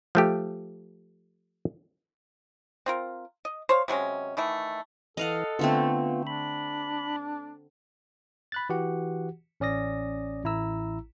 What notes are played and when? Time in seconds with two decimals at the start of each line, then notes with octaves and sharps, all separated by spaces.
0.15 F3 A3 G4
2.86 C4 F4 A#4
3.45 D#5
3.69 C5 C#5 F5
3.88 C3 F#3 G#3 C#4
4.37 D#3 E3 A3
5.17 E3 A4 D#5 F5 F#5
5.59 D3 A3 B3 C4 F4
6.27 D4 B5
8.52 B5 F#6 A6
8.69 E3 F#4 G4 F#5
9.60 A1 C#4 D5 D#6 A#6
10.44 A1 E4 A#5 E6